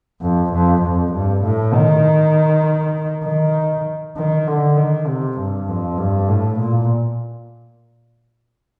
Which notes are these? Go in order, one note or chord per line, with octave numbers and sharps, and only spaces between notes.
F2
F2
F2
G2
A2
D#3
D#3
D#3
D3
D#3
C3
G2
F2
G2
A2
A#2